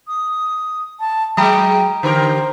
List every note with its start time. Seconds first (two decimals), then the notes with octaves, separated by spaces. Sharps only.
0.08 D#6
1.00 A5
1.37 F#3 G#3 G5 A#5 D#6
2.03 D3 G4 A#4 C5